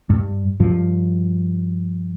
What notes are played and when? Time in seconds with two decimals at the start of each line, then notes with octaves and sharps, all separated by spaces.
0.10 G2
0.60 G2 F3